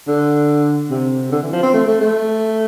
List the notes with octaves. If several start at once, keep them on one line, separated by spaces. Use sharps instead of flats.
D3
C3
D3
E3
F3
C4
A3
A3
A3